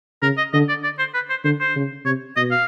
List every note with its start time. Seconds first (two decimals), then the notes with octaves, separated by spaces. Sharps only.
0.22 C#3 A#4
0.38 D#5
0.53 D3 D#5
0.69 D5
0.84 D5
0.99 C5
1.14 B4
1.30 C5
1.44 D3 C5
1.60 C5
1.76 C#3
2.05 C3 C#5
2.37 B2 D#5
2.51 F5